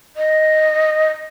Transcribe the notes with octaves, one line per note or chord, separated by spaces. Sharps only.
D#5